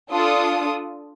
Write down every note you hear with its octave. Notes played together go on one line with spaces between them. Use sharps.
D4 F4 A4 D#6